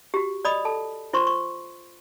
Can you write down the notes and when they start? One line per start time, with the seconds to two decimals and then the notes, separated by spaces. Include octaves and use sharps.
0.14 F#4 G4
0.45 D5 D#5 B5 D#6
0.65 A4 A5
1.13 F4 C5 C6 C#6
1.27 C#6